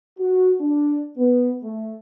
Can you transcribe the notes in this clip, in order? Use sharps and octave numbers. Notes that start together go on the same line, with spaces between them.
F#4
D4
B3
A3